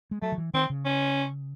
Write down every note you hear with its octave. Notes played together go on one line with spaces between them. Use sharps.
G#3
F#3 A3
D#3
E3
D#3 C4
C#3
C#4